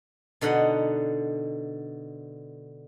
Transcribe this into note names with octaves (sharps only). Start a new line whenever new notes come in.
B2 D3 D#4 F#5